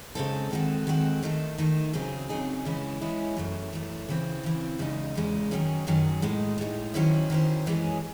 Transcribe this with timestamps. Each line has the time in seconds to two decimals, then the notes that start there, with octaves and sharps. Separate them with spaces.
0.15 C#3 G#3 C4 D#4 A4
0.51 D#3 G#3 C4 F#4 A4
0.87 D#3 G#3 C4 F#4 A4
1.23 D#3 A3 D#4 A4
1.58 D#3 A3 D#4 A4
1.93 C#3 F#3 C4 D#4 G#4
2.29 C#3 F#3 C4 D#4 G#4
2.65 C#3 E3 G#3 C#4 E4
3.01 C#3 E3 G#3 C#4 E4
3.37 F#2 E3 A3
3.72 F#2 E3 A3
4.09 C#3 E3 C4
4.43 C#3 E3 C4
4.79 E2 C#3 G#3 D#4
5.15 E2 C#3 G#3 D#4
5.51 F#2 D#3 F#3 C#4 G#4
5.87 F#2 D#3 F#3 C#4 G#4
6.22 A2 G#3 D#4
6.58 A2 G#3 D#4
6.94 D#3 F#3 C#4 E4 C5
7.30 D#3 F#3 C#4 E4 C5
7.66 F#2 E3 G#3 C#4 G#4